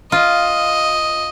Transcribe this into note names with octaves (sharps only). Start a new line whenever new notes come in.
F4 D#5